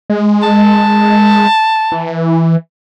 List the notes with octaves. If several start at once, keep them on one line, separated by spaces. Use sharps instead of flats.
G#3
A5
E3